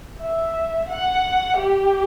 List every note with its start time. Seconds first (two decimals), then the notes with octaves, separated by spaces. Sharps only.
0.20 E5
0.89 F#5
1.57 G4